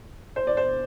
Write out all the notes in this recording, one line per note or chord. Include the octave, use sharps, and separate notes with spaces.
C5
D5
C5